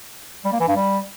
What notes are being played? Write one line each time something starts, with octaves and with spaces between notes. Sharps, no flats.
G3
A#3
E3
G2
G3